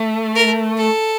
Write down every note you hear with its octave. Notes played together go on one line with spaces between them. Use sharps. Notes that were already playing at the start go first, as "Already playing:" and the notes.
Already playing: A3
A#4
A4